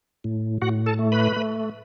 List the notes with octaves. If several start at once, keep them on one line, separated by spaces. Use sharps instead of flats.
A2
A2 F#4 F#5
A4 A5
A3
B4 B5
A3